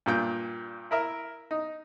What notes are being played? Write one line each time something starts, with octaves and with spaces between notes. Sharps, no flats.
G2 A#2 G5
E4 A#4 E5
D#4